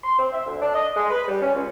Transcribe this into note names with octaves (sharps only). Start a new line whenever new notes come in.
C6
C4
E5
D2
D4
D#5
G#3
B4
G3
C#4
C#2